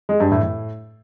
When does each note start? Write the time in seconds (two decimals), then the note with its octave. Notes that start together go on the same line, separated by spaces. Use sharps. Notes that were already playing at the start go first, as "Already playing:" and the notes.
0.09 G#3
0.20 G2
0.31 A2
0.43 A2